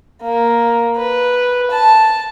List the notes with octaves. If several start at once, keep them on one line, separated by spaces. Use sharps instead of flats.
A#3
B4
A5